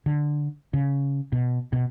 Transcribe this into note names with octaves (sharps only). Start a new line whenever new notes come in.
D3
C#3
B2
B2